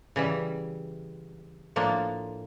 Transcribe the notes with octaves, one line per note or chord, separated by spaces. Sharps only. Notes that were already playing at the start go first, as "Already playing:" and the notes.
C#3 E3 G3
A2 F3 A#3 D4